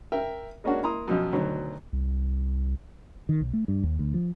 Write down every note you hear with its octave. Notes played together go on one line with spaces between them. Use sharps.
A#4 E5 G5
G#3 A#3 C#4 D4 F#4
A#3 E4 A#5 C6 D#6
F#2 B2 F3
D2 B2 D#3 F#3
C2
D#3
B1
A3
G2
D#2
D2
F3